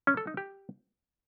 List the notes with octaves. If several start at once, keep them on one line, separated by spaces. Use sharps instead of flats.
C#4
A4
D#4
G4